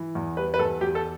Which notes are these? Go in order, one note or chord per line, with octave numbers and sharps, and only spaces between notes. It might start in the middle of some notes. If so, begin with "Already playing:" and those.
Already playing: E3
E2
G3 B4
B4
E2 A4
E2 G4
A4